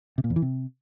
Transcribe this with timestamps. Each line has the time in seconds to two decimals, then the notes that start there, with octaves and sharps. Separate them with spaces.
0.18 C3
0.24 A#2
0.30 E2
0.36 E3
0.42 C3